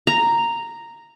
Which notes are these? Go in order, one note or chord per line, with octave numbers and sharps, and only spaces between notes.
A#5